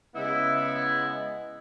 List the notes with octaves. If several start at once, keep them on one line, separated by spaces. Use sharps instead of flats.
C#3 G#3 B3 E4